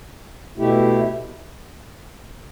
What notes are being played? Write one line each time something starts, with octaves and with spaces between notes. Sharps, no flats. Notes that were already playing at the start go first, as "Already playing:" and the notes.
B2 A3 E4 G4